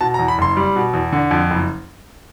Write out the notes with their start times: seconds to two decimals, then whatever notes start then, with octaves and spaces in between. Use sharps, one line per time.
0.01 B2 A5
0.14 A#5
0.19 E2
0.28 B5
0.38 F#1 C6
0.57 G3
0.76 B2
0.93 E2
1.12 D3
1.31 F2
1.50 F#1